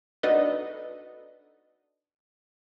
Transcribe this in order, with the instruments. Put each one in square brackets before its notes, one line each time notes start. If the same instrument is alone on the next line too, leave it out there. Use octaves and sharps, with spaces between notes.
[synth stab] D4 D#4 F#4 A4 B4 D#5